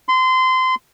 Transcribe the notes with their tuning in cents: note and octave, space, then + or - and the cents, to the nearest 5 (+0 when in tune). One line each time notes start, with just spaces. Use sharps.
C6 -25